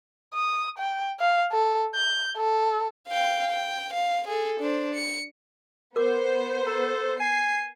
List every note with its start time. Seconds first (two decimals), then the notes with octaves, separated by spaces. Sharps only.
0.34 D#6
0.78 G5
1.20 F5
1.52 A4
1.95 G6
2.37 A4
3.08 F5 G5
3.50 G5
3.93 F5
4.28 G#4 A4
4.60 D4 C5
4.95 C#7
5.96 B3 A#4 C5 D6
6.67 A4 A#5
7.20 G#5 C7